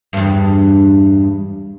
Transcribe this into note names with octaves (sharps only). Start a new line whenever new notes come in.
E2 G2